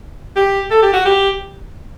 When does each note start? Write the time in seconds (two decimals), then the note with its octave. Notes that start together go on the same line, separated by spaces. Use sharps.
0.36 G4
0.71 A4
0.83 G4
0.93 F#4
1.05 G4